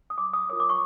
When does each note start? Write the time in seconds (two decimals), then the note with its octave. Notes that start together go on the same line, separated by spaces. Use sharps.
0.10 D#6
0.18 D6
0.33 D#6
0.49 F4 A#4 C#5 D#6
0.60 D6
0.69 C#6